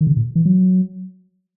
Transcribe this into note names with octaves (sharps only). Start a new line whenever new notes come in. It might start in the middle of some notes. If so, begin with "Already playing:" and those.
D#3
C#3
A#2
E3
F#3